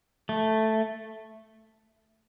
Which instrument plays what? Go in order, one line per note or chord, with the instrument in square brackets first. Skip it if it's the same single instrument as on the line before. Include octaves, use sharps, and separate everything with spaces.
[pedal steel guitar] A3